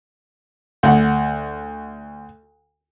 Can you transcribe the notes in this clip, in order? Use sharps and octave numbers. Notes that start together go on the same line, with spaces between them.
D2 F#5